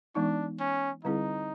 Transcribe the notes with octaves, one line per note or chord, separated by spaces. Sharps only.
E3 G#3 B3 D4 D#4
C#4
D3 G3 C4 D#4 E4 G#4